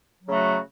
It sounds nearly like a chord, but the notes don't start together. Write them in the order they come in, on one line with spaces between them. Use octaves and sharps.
F#3 C#3 A3 F#4